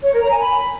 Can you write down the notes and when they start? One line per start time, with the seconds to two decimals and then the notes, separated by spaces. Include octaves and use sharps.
0.04 C#5
0.13 A#4
0.22 A#5
0.31 G#5
0.40 B5